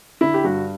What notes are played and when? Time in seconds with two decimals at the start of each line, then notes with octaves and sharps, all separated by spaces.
0.21 D3 E4
0.34 G4
0.44 G2 F#4